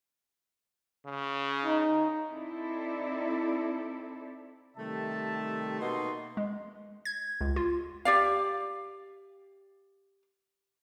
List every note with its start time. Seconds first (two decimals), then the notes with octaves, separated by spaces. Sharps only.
1.06 C#3
1.66 D#4
2.32 C4 D#4 E4 A4 D5
4.77 C3 D#3 G3 A3 E5 A5
5.80 B2 A#3 D#4 F#4 C6
6.37 G#3
7.05 G#6
7.41 C#2
7.56 F4
8.05 G4 D5 F5